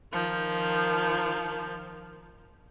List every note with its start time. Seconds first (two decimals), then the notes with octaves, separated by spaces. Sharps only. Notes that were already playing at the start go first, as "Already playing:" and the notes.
0.12 D#3 F3